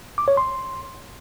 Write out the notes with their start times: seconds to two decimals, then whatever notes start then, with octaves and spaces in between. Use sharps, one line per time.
0.18 D6
0.28 C#5
0.37 C6